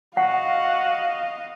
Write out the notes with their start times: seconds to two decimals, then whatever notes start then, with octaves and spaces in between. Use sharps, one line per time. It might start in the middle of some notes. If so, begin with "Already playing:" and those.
0.17 F#4 D#5 F5 F#5